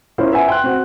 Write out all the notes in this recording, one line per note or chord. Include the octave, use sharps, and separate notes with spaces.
C#4 E4 F4 A#4 C5
B4 E5 F#5 G#5
G5 C6 F#6
C4 F#4